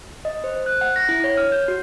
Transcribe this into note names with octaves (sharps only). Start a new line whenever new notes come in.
D#5
C5
F#6
F#5
A#6
E4
C#5
F6
G6
F#4